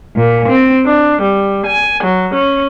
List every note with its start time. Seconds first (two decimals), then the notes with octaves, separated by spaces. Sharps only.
0.16 A#2
0.48 C4
0.85 D4
1.23 G3
1.66 G#5
2.03 F#3
2.35 C#4